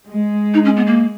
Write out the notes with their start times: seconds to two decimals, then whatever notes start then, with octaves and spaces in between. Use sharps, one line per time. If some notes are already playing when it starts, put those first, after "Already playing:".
0.09 G#3
0.54 D#4
0.65 C#4
0.77 B3
0.87 A#3